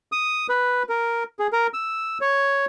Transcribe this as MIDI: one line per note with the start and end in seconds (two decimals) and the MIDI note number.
0.12 0.47 87
0.49 0.83 71
0.89 1.24 70
1.39 1.47 68
1.53 1.67 70
1.74 2.18 88
2.21 2.66 73